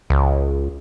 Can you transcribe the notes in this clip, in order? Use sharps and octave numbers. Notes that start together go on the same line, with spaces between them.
C#2